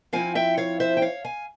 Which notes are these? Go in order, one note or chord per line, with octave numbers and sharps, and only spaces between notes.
F3 C4 E4 F5 G#5
E5 G5
C#5 F5
C5 E5
G5
C#5 F5
F5 G#5